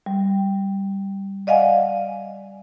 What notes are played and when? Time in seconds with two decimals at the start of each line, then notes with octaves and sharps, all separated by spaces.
0.06 G3
1.47 D5 D#5 F5 F#5 G#5